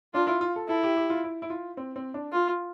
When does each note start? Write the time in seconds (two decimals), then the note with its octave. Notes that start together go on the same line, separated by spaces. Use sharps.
0.14 D4 F4
0.27 E4
0.41 F4
0.56 A4
0.68 E4 A4
0.83 G4
0.96 G4
1.10 F4
1.24 E4
1.42 E4
1.50 F4
1.77 C4
1.96 C4
2.14 D4
2.33 F4